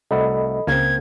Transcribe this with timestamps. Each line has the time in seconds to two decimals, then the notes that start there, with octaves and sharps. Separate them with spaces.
0.11 C2 A3 F#4 A4 D#5 B5
0.67 C#2 C#3 A#3 C4 G#6